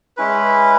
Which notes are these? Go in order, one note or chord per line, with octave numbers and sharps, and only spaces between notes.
G#3 C#4 E4 B4